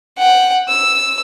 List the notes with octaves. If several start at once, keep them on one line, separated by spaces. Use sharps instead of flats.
F#5 G5
E6